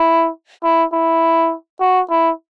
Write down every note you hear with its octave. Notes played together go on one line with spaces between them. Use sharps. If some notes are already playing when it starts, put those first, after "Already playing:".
Already playing: E4
E4
E4
F#4
E4